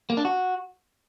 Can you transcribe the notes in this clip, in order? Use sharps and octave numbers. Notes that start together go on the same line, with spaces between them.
A#3
D4
F#4